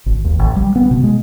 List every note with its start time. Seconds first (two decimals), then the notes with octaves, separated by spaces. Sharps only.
0.06 G#1
0.24 D#2
0.39 A1
0.56 G3
0.76 B3
0.91 B2
1.04 G#3